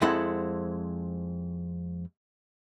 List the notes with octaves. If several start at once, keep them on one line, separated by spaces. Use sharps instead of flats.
F2 G#3 C4 E4 A4 F#5